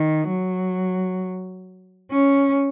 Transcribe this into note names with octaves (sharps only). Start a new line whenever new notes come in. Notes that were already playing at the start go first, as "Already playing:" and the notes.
Already playing: D#3
F#3
C#4